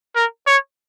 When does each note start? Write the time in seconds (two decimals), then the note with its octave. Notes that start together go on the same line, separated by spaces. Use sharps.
0.16 A#4
0.47 C#5